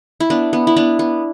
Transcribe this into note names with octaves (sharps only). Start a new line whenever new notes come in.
E4
B3 D4
B3
E4
B3 D4
B3